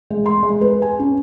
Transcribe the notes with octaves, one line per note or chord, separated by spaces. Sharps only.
G#3
C6
G#3
B4
G#5
C#4